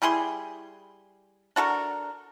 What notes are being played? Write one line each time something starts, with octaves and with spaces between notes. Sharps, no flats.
G3 E4 G#4 C6
D4 F#4 A4 A#4